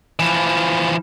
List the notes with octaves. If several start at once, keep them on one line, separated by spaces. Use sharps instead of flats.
E3 F3